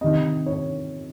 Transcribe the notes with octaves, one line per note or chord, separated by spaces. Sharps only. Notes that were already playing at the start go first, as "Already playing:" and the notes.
C3 D#3 D#5
C#5